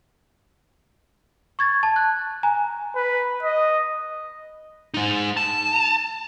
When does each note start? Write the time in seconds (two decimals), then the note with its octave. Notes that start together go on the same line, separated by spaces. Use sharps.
1.59 C#6 G#6 A6
1.83 A5
1.96 F#6
2.43 G#5 A#5
2.95 B4
3.43 D#5
4.94 G#3 D#4
5.37 A5